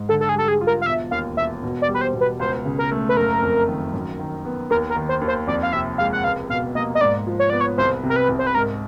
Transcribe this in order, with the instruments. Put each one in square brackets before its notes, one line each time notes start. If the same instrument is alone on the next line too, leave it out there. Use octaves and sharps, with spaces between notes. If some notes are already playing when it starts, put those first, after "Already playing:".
Already playing: [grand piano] G#2
[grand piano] D3 [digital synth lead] A4
[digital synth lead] A4
G#4
[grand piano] G3 [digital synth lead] A4
[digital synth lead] G#4
[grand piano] F4
[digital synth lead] A#4
F5
[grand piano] E1 [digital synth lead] E5
[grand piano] D#2 [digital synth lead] F5
[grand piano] E1 [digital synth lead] E5
[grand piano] B2
[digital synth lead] D5
[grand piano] G3
[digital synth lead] B4
C5
[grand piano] B2
[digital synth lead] B4
[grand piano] C#2 [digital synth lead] C5
[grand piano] C#3
[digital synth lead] A#4
[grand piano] A3
[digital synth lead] B4
[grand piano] F#1 [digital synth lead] A#4
[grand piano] F2
D#3
F#2
D#3
B3
[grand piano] D#2 [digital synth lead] A#4
[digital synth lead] A#4
[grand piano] D#3
[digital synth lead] C5
[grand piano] D#2
[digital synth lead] C5
[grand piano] F2 [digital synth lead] D5
[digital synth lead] F5
[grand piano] C3 [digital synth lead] E5
[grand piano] G#3 [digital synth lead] F5
[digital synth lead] F#5
[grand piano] C#2 [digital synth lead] F5
[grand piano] B2 [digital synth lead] F5
[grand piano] A#3 [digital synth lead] D#5
[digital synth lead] D#5
[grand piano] G#2 [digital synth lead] D5
[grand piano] F3
[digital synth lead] C#5
[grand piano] B3 [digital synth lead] D5
[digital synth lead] C#5
[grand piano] C2 [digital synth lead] C5
[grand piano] C3
[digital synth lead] A#4
B4
[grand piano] C2
[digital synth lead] C5
B4
[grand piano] G#2 [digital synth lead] A#4